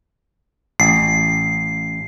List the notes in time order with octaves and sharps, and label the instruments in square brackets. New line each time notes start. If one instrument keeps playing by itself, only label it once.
[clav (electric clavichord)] A1 [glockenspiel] C7